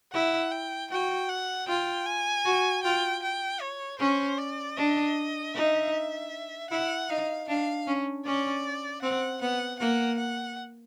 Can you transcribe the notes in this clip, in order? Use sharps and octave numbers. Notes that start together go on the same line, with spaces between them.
E4 F#5
G5
F#4 G5
F#5
F4 G5
G#5
F#4
F4 G5
G5
C#5
C#4 C5
D5
D4 D#5
D#4 E5
E4 F#5
D#4 F5
D4 F5
C#4
C#4 D5
C4 F#5
B3 F#5
A#3 F#5
F#5